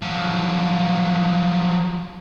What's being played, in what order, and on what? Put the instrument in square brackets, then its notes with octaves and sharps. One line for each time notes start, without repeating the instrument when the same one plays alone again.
[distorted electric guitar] F3 F#3